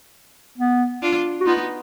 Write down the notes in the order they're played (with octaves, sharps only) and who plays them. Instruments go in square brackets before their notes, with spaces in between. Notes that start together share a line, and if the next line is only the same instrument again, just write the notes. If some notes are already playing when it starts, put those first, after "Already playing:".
[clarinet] B3
[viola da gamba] D4 F4
[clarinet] F#4
[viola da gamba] B3 D#4 [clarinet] F4